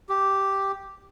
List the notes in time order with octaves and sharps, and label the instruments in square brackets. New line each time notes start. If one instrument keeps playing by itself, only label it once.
[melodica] G4